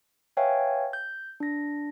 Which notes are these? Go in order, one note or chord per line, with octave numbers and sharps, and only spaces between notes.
B4 C#5 E5 F5 G5 G#5
G6
D4 A#6